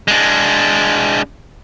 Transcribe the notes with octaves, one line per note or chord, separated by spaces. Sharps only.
G#3 D4